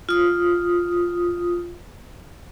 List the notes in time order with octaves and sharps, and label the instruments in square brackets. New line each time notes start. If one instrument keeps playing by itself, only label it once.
[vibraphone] F4 D#6